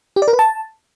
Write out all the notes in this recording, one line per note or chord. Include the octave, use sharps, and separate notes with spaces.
G4
D5
A#4
B4
A5